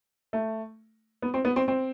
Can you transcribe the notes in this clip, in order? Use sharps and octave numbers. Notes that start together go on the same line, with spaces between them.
A3
B3
C4
B3
C4
C4